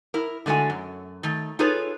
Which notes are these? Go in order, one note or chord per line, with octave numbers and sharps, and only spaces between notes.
E4 A#4
D3 G#3 A3 F#4 G#5
F#2
D#3 A3
D#4 F4 G#4 A4 B4 C#5